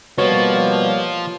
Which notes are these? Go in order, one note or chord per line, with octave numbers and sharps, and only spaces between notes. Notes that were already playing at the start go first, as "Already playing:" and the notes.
B2 F3 G3 A#3 C#5